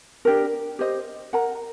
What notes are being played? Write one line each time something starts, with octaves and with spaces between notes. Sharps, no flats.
D4 G4 A#4
G4 C5 D#5
A#4 F#5 A#5